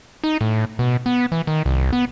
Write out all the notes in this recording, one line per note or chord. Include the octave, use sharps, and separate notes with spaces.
D#4
A2
B2
B3
E3
D#3
C2
B3